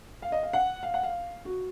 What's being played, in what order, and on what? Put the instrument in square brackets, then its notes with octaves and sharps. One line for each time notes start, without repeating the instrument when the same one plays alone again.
[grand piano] F5
D#5
F5
F#5
F5
F#5
F5
F#4